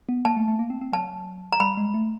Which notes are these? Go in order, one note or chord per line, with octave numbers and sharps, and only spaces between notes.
B3
A#3 A5
A3
A3
A#3
C4
C4
F#3 A5
A#5
G3 B5
G#3
A3